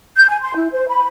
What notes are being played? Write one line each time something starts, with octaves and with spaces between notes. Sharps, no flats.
G6
G#5
C6
E4
C5
B5